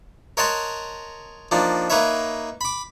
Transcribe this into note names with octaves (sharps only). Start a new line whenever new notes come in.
A#4 C#5 D#5 F#5 A5 C6
F3 A#3 D4 D#4
A#3 D#4 B4 C#5 E5
B5 D6